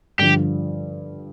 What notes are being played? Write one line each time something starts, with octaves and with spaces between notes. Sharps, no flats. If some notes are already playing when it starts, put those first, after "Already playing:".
G2 D3 F3 G4